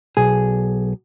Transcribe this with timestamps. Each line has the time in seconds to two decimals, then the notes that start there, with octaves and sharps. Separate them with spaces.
0.17 B1 G#4